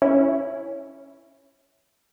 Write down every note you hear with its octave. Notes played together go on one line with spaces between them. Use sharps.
C#4 E4